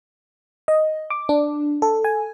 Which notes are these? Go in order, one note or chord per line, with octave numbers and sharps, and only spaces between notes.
D#5
D6
D4
A4
G#5